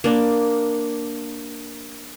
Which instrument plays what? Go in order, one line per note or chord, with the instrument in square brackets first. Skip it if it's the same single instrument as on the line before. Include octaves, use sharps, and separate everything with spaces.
[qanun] A#3 D4